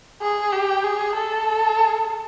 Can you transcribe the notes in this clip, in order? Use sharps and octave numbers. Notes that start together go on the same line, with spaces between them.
G#4
G4
G#4
A4